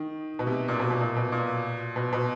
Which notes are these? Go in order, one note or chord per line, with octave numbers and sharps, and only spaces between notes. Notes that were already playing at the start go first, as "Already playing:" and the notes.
Already playing: D#3
B2
C3
A#2
B2
B2
A#2
B2
A#2
B2
B2